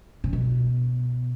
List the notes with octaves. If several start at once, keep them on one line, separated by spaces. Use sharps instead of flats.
C#3
B2